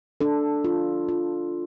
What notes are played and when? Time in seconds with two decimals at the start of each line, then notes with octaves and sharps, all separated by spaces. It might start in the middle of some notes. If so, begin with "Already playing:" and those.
0.21 D4 A4
0.65 F4
1.09 F4